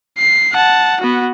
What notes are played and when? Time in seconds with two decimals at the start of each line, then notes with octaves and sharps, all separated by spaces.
0.18 C7
0.53 F#5 A5
1.00 B3 F#4